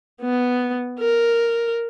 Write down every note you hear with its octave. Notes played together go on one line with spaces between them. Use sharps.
B3
A#4